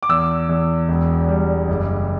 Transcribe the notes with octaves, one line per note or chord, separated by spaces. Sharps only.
D6
E2 E6
E2
E1
G3
F#1